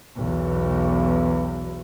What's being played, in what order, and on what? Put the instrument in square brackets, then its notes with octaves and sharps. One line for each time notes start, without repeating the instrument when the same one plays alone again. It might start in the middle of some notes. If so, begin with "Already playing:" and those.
[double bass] B1 E2